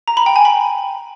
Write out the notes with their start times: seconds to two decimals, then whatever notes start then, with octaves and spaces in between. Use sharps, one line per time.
0.08 A#5
0.17 B5
0.26 G5
0.36 G#5
0.45 B5